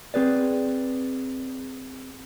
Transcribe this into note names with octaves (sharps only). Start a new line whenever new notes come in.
C4 G#4 B4 D5